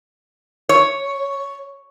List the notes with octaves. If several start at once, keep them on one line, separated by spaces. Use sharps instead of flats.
C#5